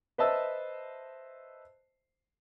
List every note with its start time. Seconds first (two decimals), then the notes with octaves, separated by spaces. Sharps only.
0.18 B4 C5 D#5 E5 A5 E6